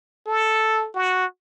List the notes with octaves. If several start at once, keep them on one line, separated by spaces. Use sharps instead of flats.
A4
F#4